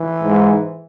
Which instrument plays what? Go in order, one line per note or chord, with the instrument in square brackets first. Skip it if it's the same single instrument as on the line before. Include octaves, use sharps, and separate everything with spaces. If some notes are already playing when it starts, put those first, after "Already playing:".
Already playing: [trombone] E3
[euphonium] G#2